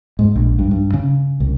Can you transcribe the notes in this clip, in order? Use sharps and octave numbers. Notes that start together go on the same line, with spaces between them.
G#2
A#1
G2
G2
C#3
C2